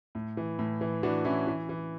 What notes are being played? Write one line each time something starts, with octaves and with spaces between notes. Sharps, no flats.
A2
E3
A2
E3
E3 D4 F#4
E3 C#4 E4
E3
E3